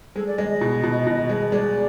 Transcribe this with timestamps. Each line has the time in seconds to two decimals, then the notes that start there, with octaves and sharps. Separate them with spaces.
0.16 G#3 A4
0.27 D5
0.38 G#3 D#5
0.50 D#5
0.61 B2
0.83 B2
1.07 B2
1.29 G#3
1.52 G#3 D5